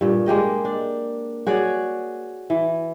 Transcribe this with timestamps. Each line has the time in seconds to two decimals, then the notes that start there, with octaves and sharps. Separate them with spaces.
0.01 G2 A#2
0.26 G#3 A#3 G4 D#5
0.65 D4
1.47 F#4 G#4 C#5 D5
2.50 E3